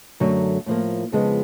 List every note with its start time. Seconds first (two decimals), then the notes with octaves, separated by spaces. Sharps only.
0.20 F#2 D3 F#3 A3
0.66 A2 F3 A#3
1.12 F2 C#3 F3 G#3 B3